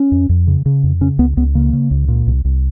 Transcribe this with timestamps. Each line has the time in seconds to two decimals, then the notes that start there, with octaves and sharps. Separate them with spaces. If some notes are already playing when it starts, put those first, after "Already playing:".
Already playing: C#4
0.12 F2
0.29 F2
0.47 C#3
0.66 C#3
0.83 F2
1.01 C#3 C#4
1.19 C#2 B3
1.37 C#2 B3
1.55 C#3 A#3
1.73 C#3
1.91 C#2
2.08 A#2
2.27 C2
2.45 C2